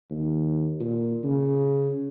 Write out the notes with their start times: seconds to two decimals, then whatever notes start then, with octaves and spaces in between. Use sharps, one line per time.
0.10 D#2
0.80 A#2
1.23 C#3